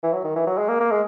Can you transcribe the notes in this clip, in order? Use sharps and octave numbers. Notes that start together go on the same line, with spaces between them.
E3
F#3
D#3
E3
F#3
G#3
A#3
A#3
G#3